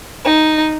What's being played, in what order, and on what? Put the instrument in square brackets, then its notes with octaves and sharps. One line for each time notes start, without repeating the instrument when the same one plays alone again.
[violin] D#4